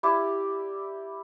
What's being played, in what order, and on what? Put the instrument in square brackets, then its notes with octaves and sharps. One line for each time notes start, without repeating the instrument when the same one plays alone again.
[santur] E4 G4 D5